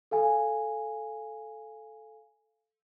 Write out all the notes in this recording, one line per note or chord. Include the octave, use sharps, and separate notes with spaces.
A4 F5 G#5